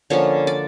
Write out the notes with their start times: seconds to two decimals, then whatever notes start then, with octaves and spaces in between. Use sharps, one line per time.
0.10 D3 F3 A#3 C#4 C#5
0.47 D5